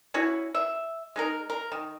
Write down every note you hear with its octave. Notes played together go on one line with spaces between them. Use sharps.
C#4 E4 F#4
E5
G#3 D#4 A#4
A#4
D#3